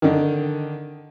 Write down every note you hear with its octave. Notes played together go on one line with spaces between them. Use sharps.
D3 D#3